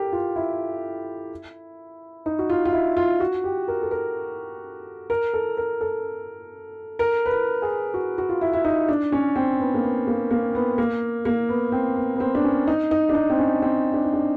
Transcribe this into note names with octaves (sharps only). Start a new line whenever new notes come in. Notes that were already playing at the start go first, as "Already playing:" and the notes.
Already playing: G4 A4 A#4
F4
E4
D#4
F#4
F4
F4
E4
F4
F#4
G4
A#4
A4
A#4
A#4
A4
A#4
A4
A#4
B4
A#4
G#4
F#4
F#4
F4
E4
E4
D#4
D4
C#4
C4
B3
A#3
B3
A#3
A#3
B3
A#3
A#3
B3
C4
B3
B3
C4
D4
C#4
D#4
D#4
D4
D#4
C4
C#4
C4
D4
D#4
D4